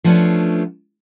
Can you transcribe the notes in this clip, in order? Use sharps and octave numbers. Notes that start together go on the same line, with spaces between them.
F3 A3 B3 C#4 D4